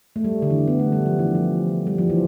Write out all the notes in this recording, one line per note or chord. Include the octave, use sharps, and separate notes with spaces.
A3
G3
D3
E3
B3
A3
G3
F3
E3
F3
G3
F3
E3